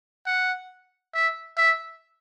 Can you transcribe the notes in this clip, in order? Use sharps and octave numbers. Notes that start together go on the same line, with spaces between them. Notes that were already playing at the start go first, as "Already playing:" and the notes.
F#5
E5
E5